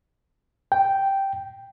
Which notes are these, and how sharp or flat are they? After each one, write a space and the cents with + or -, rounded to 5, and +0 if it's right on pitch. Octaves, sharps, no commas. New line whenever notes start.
G5 -5